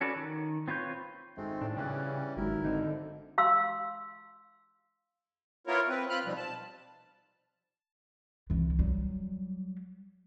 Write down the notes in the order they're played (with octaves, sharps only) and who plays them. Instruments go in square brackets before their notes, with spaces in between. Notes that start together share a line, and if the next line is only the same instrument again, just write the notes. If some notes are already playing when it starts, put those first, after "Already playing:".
[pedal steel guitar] C#4 F#4 A4 B4 D5
D#3
C4 F4 B4 C#5 G6
[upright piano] G#1 [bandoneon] G#3 A3 C4
[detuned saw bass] A2 [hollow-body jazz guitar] D4
[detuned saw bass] C#3 [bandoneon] E3 G3 C#4 [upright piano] G5 F#6
[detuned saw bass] G1 [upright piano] G#2 D#3 F#3 [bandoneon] E4 A#4
[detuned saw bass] D3 [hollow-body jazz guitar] C4 D#4
[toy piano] F5 C6 E6
[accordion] B3 E4 F4 A#4 C#5
C4 B4
C4 F4 B5 F6 F#6
B2 D#3 F3 G3
A5
[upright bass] C2 E3
F#3 G3